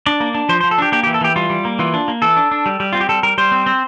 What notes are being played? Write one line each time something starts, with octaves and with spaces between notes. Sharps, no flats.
D4 D5
A#3
D4
F3 C5
C5
F3
A4
D4 G4
A#3 G4
G4
E3
A4
E3 G4
G3 F4
G3
A#3
E3 F4
D4
A#3
E3 A4
D4
D4
G3
G3
C4 F4
G4
G3 A4
G3 A#4
G3 C5
C4
C4